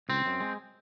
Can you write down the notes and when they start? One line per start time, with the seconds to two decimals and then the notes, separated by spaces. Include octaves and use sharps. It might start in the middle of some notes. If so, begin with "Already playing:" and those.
0.09 C#2 C4
0.26 F#2
0.40 G#3